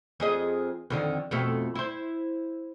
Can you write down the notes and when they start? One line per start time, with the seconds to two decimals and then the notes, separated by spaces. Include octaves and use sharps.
0.20 F2 G#4 D#5
0.90 F2 D3 D#3
1.31 F2 B2 A3
1.75 E4 C5